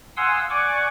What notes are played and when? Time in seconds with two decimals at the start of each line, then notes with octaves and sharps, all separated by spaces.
0.17 F5 F#5 G#5 C6 D#6 E6
0.50 D5 F#5 G#5 C#6 D6